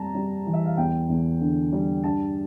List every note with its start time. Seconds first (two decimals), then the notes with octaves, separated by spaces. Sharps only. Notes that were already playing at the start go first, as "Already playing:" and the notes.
Already playing: F2 G3 A5 A#5
0.15 G3
0.46 E3
0.53 E5
0.65 F5
0.77 E2 G5
1.09 E2
1.41 D3
1.73 G3
2.03 G2 A5